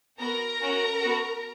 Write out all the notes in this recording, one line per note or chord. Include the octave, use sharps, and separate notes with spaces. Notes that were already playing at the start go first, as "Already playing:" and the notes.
B3 F#4 A#4 A#5
C#4 F#4
B3 F#4